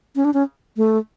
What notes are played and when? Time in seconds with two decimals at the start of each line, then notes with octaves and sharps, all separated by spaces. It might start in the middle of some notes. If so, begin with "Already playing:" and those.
0.16 C#4
0.25 D4
0.34 C#4
0.77 A3